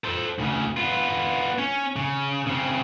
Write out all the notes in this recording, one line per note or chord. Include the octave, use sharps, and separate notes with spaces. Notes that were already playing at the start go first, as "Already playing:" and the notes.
A4 C5
D2 C#3
B3 F4
C#4
C#3
C#3 C4